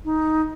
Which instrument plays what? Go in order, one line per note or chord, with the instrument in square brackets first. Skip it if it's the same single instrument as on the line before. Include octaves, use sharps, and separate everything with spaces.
[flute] D#4